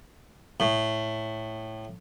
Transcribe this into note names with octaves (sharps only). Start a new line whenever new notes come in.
A2